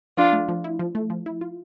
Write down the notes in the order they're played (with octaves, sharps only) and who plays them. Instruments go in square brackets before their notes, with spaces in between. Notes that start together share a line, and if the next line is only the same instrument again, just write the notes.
[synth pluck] F3 [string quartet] D4 F4
[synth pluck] A3
F3
E4
F3
A3
F3
E4
F4